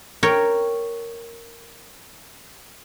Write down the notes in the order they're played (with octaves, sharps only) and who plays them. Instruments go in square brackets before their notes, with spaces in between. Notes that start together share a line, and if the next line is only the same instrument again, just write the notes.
[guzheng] A#4 C#5 G5